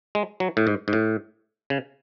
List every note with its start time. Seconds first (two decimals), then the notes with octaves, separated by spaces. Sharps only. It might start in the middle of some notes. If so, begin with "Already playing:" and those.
0.15 G#3
0.40 F#3
0.57 A2
0.67 G#2
0.88 G#2
0.93 A2
1.70 C#3